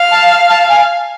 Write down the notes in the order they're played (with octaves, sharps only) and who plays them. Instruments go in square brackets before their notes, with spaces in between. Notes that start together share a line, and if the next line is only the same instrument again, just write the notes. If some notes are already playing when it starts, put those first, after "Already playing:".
Already playing: [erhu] F5
[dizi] A5
A5
G#5